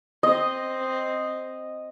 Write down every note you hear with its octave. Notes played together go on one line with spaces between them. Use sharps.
C4 D#5